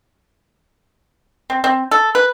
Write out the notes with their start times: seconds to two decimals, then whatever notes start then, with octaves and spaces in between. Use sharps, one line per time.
1.50 C4
1.64 C4
1.91 A4
2.15 B4